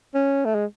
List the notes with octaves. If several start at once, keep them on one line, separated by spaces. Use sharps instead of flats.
C#4
A3
G#3